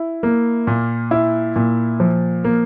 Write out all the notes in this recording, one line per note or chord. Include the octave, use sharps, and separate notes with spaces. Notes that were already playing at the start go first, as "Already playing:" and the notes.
Already playing: E4
A#3
A#2
E4
A#2
F3
A#3